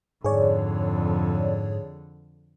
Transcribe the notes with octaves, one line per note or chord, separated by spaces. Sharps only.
F2 G#2 D3 G#4 C#5 D5